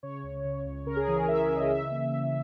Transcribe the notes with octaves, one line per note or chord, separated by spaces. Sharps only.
C#3 C#5
C#2
C#3
C#2
C#3 A#4
G#4
E3 G#4
A#4
E3 E5
E5
C#3
D#5
E3 E5
A#3
E3